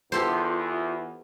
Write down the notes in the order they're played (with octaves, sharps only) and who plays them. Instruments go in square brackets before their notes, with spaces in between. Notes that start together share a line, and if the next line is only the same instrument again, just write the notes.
[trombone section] E2 [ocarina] F4 [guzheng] G4 A4 C5